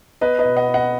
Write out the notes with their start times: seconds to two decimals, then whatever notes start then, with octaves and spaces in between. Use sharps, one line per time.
0.21 B3 B4 D#5
0.39 B4 D#5
0.45 B2
0.56 D#5 F#5
0.68 B3
0.74 D#5 F#5